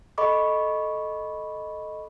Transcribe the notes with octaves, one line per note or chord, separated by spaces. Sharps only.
A4 D#5 B5 C#6 D6